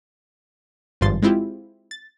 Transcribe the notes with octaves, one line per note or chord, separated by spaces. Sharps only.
G#1 G2 F3 C6 A6
G#3 C4 E4 F4 G4
A6